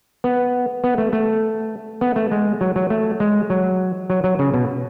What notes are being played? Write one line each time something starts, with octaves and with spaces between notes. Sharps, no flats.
B3
B3
A3
A3
B3
A3
G#3
F#3
F#3
A3
G#3
F#3
F#3
F#3
C#3
B2